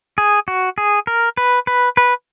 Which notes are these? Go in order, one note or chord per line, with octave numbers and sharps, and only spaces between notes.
G#4
F#4
G#4
A#4
B4
B4
B4